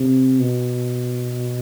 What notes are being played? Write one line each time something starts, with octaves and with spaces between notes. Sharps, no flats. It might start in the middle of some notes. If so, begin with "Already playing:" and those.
Already playing: C3
B2